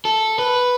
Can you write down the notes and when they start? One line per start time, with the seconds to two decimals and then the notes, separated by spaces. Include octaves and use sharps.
0.05 A4
0.39 B4